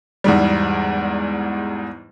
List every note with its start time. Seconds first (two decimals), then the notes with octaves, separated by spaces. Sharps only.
0.24 E2 G#2 G3